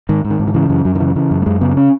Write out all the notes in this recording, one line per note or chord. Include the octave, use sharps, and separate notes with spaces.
G#2 D#3
G#2
D#3
G#2
D#3
C#3 E3
F#2 E3
F#2 F#3
D#3
C#3 E3
C#3 E3
F#2
A3
F#2 G#3
C#3 B3
C#4